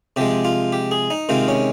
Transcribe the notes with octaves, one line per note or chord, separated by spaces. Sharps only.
C3 F3 G#3 G4
F4
G4
G#4
D#4
C3 D#3 G#3 F4
C#4